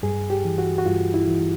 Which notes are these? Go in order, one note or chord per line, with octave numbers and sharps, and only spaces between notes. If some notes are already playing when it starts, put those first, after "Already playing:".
G2 G#4
G4
E3
F#4
F#4
G2 F4
E4
E3